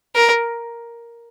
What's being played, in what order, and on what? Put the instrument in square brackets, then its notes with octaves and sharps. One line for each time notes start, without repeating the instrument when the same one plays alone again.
[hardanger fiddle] A#4